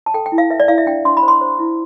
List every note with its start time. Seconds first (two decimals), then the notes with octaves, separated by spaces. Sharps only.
0.06 A5
0.14 A4 G5
0.26 G5
0.32 E4
0.38 F5
0.50 B4 E5
0.60 D5
0.68 E4 F5
0.78 E5
0.86 D4 G5
1.05 D4 C6
1.17 B5
1.23 C5
1.28 C6
1.41 C5
1.59 E4